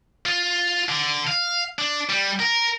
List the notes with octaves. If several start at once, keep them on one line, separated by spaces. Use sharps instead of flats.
F4
D3
F5
D4
G3
A#4